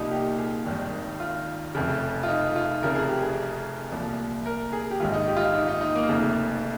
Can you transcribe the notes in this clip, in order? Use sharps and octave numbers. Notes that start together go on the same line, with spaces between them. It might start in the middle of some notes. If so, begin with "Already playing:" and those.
Already playing: C2 A#2 F3 D#4 F4 G4
G4
G#4
G#1 G2 D#3
F4
F1 F2 C#3
F4
D#4
F4
F1 F2 C#3 F3 A#4
G#4
G4
G#4
C2 A#2 F3
A#4
G#4
G4
A#1 G#2 D#3 F4
D#4
G4
F4
D#4
D#4
D#4
D#4
A#3
F1 F2 C#3